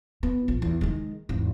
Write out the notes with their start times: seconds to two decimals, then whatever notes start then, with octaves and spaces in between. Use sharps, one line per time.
0.23 B3
0.48 A#1
0.62 E2
0.81 D#3 G#3
1.29 G#1 E2